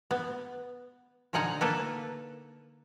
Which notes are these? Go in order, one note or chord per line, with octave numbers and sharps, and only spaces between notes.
B3
A#2 D3 D#4 F#5 G#5 A#5
A#3 A4 B4